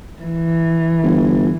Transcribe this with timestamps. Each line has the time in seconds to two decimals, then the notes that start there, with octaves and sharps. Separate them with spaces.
0.23 E3
1.03 G1